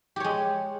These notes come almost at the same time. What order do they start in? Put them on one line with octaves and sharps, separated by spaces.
G4 C#5 G#3